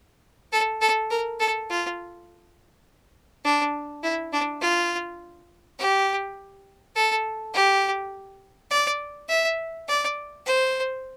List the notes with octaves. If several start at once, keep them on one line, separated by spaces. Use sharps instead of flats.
A4
A4
A#4
A4
F4
D4
E4
D4
F4
G4
A4
G4
D5
E5
D5
C5